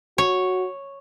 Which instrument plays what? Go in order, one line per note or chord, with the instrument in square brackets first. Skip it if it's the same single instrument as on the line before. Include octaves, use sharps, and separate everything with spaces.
[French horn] F#4 [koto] C#5